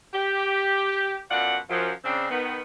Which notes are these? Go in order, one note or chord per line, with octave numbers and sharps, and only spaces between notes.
G4
F#2 B2 F4 F#4 D5 F#5
F#2 F3
C#3 C4 D4
D#3 B3